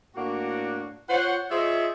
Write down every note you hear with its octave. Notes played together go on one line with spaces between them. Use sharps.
A2 A#3 D4 F#4
F4 C5 C#5 F#5
F4 G#4 C5 C#5 D#5 E5